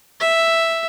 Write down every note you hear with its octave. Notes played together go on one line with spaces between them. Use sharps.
E5